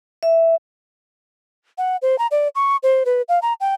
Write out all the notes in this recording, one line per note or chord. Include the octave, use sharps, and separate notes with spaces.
E5
F#5
C5
A#5
D5
C#6
C5
B4
F5
A#5
G5